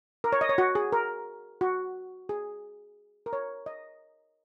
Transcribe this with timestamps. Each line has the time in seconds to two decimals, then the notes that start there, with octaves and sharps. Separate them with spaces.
0.24 A#4
0.33 C#5
0.41 D#5
0.49 C#5
0.58 F#4
0.75 G#4
0.92 A#4
1.61 F#4
2.29 G#4
3.26 A#4
3.33 C#5
3.66 D#5